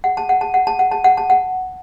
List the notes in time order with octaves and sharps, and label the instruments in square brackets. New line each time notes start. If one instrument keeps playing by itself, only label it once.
[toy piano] F#5
A5
F#5
A5
F#5
A5
F#5
A5
F#5
A5
F#5